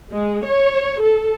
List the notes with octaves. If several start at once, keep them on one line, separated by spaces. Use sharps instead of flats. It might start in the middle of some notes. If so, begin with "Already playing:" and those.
G#3
C#5
A4